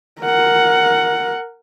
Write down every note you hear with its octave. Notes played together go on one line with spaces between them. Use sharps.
A#4 F#5